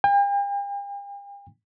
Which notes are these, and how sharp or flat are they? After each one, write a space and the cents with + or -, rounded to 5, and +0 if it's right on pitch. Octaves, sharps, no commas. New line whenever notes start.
G5 +45